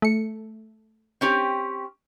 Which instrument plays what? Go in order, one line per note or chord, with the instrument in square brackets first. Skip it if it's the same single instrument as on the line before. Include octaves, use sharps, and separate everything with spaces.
[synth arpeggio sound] A3 C#7
[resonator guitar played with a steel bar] C4 C#4 G4